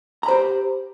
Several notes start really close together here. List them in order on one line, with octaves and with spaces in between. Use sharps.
A#5 B5 C5 G4